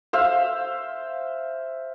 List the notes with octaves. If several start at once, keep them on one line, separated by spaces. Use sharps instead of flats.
C5 E5 F5